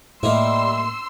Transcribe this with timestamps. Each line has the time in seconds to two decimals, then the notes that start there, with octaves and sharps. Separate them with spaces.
0.23 A2 G3 A#3 D#4 E4 C6 E6